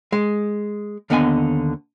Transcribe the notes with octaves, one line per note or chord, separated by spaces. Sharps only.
G#3
D#2 D3 B3 D#5 G#5